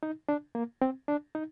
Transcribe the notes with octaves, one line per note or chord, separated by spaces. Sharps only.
D#4
D4
A#3
C4
D4
D#4